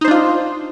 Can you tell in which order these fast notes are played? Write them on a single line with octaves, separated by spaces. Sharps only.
D#4 C5 D4 F4